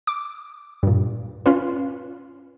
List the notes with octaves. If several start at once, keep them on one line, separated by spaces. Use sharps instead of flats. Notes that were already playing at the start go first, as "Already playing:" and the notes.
D6
G2 A#2
C#4 F4 B4